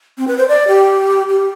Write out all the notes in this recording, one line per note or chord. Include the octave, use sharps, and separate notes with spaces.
C4
B4
C5
D5
G4
G4